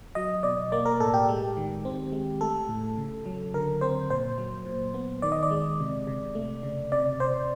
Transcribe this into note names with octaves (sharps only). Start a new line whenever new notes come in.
F#3 D#5
B2 D5
A#3 D5
A#4
A2 A4
G4
G#3
D#3
C4
G#3
A3 A4
A2
C#3
F#3
D3 A#4
C4 C5
A#2 C5
F#3
A#2
B3
D#3 D5
D#5
D5
G#3
C3
C3
A3
C#3
C3 D5
C3 C5